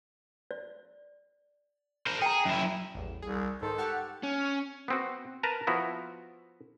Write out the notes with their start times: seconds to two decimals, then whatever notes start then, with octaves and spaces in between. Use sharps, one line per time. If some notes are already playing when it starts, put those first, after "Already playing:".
0.51 D5
2.07 A#4 C5
2.22 G#4 G5 A#5
2.46 F#2 E4
2.95 A1 E2
3.22 C2 G#4
3.62 G#2 D#3 G#3 A4 C5
3.78 G4 F#5 A5 C#6 F6
4.23 C#4
4.88 B3 C4 F#4
5.43 A#4 B4 A5 A#5
5.67 F3 B3 E4 F#4